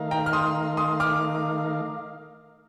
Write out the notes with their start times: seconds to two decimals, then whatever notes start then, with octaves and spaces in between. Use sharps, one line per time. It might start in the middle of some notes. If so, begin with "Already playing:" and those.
Already playing: D#3 A3 D#4 A#4 F5
0.11 G5 A#5
0.26 F6
0.33 C6 D#6
0.77 C6 D#6
1.00 D6 F6